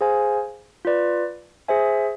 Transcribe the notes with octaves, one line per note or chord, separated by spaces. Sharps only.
G#4 C5 F5 G#5
F4 B4 D5
G#4 C5 E5 G#5